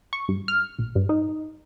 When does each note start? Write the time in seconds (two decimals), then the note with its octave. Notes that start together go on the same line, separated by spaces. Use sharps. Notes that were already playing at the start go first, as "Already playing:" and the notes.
0.13 C#6
0.29 G2
0.48 F6
0.79 A#1
0.95 G2
1.09 D#4